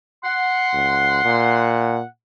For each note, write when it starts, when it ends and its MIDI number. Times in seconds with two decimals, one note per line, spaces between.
0.24 2.05 78
0.24 1.78 84
0.73 1.20 37
1.24 2.01 46